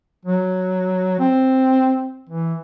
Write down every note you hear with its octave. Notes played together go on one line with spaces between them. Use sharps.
F#3
C4
E3